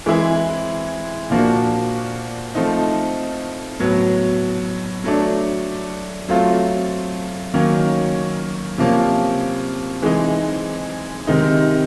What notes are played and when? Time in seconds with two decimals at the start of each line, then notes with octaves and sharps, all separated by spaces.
0.06 E3 G#3 C4 E4 G#4
1.30 A#2 F3 A#3 D4 F#4
2.55 F3 A3 C4 D#4
3.79 A2 F#3 B3
5.04 F#3 A3 D4
6.29 F#3 A3 C4 F4
7.54 D#3 F#3 A#3 C#4
8.78 C3 F3 A#3 C#4
10.02 E3 G#3 C4 D#4 G#4
11.27 C3 D#3 G#3 C4 D#4